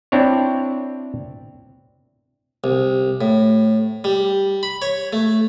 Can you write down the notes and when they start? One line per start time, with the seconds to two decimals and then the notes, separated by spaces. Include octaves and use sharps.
0.12 C4 D4 E4 C#5
2.64 C2
3.21 A2
4.04 G3
4.63 B5
4.82 C#5
5.13 A3